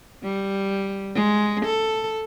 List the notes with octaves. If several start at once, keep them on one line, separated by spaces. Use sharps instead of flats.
G3
G#3
A4